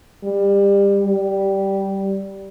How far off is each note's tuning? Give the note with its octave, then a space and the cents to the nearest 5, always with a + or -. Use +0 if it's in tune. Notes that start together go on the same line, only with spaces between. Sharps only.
G3 +25
G3 -10